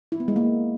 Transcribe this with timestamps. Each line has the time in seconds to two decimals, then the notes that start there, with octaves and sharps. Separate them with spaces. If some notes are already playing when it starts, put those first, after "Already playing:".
0.12 E4
0.20 B3
0.28 G#3
0.36 A#3